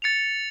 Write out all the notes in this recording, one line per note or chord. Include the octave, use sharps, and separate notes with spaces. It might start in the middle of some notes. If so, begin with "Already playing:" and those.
A6 C#7 F7